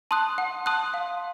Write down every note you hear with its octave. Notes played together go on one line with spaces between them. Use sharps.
A5 C6 D#6 F#6
F#5
A5 C6 D#6 F#6
F5